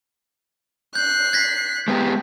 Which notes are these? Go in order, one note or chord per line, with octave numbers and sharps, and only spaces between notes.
F#6 G6 C7
G#6 A#6 B6
G#3 B3 G4